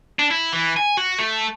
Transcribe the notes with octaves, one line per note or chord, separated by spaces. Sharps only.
D4
E4
E3
G#5
F#4
A3